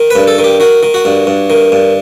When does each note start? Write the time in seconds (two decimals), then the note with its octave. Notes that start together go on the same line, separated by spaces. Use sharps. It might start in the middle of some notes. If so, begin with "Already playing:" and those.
Already playing: D#3
0.11 B4
0.16 G2
0.28 A4
0.38 D#3
0.44 G4
0.60 D#3 F#4
0.83 D#3
0.94 F#4
1.05 G2
1.27 G2
1.50 D#3
1.72 G2